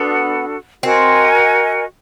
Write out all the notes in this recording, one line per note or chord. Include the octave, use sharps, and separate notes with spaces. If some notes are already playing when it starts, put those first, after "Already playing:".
Already playing: B3 D4 F#4 A4
C4 F#4 A#4 D#5 G#5